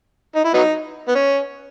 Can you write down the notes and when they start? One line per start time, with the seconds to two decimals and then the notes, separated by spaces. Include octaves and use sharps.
0.35 D#4
0.44 E4
0.54 F#3 B3 D#4
1.08 B3
1.15 C#4